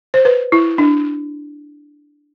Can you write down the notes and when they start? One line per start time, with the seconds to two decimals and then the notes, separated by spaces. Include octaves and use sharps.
0.14 C5
0.25 B4
0.52 E4
0.78 D4